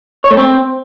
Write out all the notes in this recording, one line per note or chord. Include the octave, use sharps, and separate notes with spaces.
C#5
A3
C4